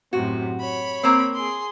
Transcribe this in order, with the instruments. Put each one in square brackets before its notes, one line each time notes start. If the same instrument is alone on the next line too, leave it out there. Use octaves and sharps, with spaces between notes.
[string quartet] F#2 A2 C3 [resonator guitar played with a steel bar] F#4
[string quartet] C#5 B5
[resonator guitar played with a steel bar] A#3 C4
[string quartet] G#4 C6